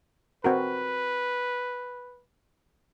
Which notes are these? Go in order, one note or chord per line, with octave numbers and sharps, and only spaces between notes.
C4 F#4 A#4 B4